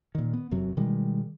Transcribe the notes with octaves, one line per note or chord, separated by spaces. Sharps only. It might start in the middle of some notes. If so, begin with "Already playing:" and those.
A#2 D#3
B3
F1 F#2 C3 F#3
B2 D#3 G3 G#3